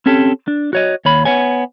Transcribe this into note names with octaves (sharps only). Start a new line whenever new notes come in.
C4 C#4 G4 A4
D4
F#4 C#5 D#5
D#2 C#5 B5
B3 C#5 G#5